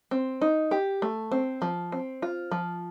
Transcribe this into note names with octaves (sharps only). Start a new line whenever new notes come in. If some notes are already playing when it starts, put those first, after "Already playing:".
C4
D#4
G4
A3
C4
F3
C4
F4
F3